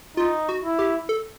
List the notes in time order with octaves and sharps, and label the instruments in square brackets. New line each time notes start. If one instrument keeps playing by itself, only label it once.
[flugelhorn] D#4 [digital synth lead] F4
[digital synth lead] F#4
[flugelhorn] E4
[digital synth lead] G4
A4